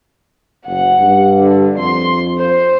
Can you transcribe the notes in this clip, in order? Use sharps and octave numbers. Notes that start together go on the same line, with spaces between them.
F#1 F#5
G2
D3
F2 C6
C5